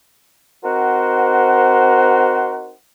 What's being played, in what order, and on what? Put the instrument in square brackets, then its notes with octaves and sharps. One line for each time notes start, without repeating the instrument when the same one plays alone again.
[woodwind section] C4 D#4 F#4 A#4 C5 F#5